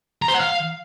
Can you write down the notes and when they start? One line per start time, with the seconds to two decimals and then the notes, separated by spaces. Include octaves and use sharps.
0.22 A#5
0.28 C5
0.34 F#5
0.40 F5